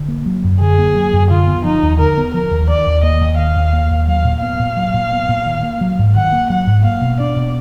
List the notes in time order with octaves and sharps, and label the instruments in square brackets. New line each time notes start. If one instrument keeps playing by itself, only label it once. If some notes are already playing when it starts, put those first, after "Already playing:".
Already playing: [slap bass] D3
A#3
F#3
F#2
[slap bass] D3 [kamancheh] G#4
[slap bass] A#3
F#3
F#2
[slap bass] D3 [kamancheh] F4
[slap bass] B3
[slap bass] F3 [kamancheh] D#4
[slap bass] D#2
[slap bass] D3 [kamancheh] A#4
[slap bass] B3
[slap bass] F3 [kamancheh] A#4
[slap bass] D#2
[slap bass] D#3 [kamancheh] D5
[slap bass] D#2
[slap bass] A#3 [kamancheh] D#5
[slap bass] D#2
[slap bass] D#3 [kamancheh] F5
[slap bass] D#2
A#3
D#2
[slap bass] F#3 [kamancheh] F5
[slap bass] A#2
[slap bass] B3 [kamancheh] F5
[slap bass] A#2
F#3
A#2
B3
A#2
D#3
A#3
F#3
G#2
[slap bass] D#3 [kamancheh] F#5
[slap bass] A#3
[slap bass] F#3 [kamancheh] F#5
[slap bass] G#2
[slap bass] A#3 [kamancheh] F5
[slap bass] B2
[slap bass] D4 [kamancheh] D5
[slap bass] B2